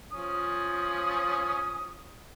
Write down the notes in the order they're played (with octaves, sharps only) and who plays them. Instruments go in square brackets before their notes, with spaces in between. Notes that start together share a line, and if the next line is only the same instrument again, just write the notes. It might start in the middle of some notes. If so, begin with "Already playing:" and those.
[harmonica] F3 C#4 D#6